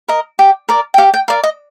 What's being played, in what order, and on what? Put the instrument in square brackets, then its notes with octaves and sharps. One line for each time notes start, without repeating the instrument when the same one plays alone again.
[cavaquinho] A#4 D#5
G4
A#4 D5
G5
G4 F5
G5
A#4 D5 F5
D#5